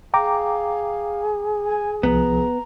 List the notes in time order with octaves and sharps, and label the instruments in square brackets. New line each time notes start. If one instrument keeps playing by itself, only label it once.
[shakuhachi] G#4 [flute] F5 [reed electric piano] G5 A#5 D6
[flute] G#5
[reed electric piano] C2 F3 [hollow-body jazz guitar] B3 [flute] A#5